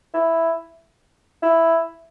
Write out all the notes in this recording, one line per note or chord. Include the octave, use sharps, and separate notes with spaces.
E4
E4